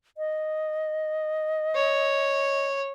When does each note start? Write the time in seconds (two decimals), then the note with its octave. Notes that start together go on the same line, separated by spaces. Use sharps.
0.18 D#5
1.75 C#5